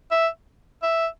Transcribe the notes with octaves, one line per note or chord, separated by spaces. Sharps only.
E5
E5